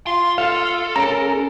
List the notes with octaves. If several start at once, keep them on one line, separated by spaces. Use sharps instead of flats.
F4 C6
A4 F5 F6
C#4 G#4 A#4 A#5 D7